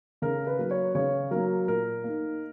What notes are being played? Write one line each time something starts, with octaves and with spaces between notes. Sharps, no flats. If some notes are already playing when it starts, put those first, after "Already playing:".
C#3 A#4
B4
F#3 A#3
C#5
C#3 C#5
F#3 A#3 A#4
A#2 A#4
A#3 D#4